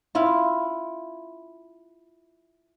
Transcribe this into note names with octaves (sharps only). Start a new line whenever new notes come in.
E4 F4